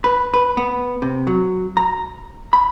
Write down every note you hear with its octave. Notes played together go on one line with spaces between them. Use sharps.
B4
B4
B3
C3
F#3
A#5
B5